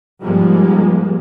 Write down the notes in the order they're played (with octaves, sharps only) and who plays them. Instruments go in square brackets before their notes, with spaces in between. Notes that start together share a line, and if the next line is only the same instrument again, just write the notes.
[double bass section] G#2 F3 G3 G#3 A#3